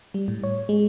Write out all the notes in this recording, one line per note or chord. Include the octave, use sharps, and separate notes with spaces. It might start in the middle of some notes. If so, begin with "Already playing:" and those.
G3
A2
C#5
G#3